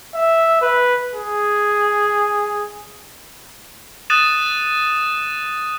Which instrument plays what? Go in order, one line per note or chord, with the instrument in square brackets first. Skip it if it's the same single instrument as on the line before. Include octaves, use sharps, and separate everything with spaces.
[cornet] E5
B4
G#4
[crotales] D#6 F#6 A6 D#7 E7